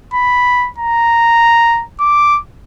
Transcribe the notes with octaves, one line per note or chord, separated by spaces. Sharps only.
B5
A#5
D6